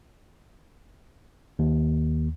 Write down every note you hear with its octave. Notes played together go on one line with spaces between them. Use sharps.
D#2